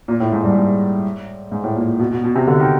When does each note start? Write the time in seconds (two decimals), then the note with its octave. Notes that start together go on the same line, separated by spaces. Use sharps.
0.08 A#2
0.20 A2
0.32 G#2
0.44 G2
0.56 G#2
1.52 G#2
1.64 A2
1.76 A#2
1.99 B2
2.11 B2
2.24 B2
2.35 C3
2.48 D3
2.60 D#3